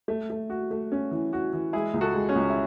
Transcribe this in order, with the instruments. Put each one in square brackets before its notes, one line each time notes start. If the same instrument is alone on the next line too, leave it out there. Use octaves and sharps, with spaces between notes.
[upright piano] A3
A3
F#4
A3
C#4
E3
F#4
E3
[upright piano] G#3 [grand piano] E4 G#4
[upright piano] C#2
[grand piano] F#4 A4
[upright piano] G#3
[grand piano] C#4
[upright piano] C#2
[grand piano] E4